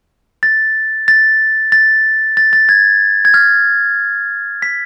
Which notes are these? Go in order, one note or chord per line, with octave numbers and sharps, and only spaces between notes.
A6
A6
A6
A6
A6
G#6
G#6
F6
B6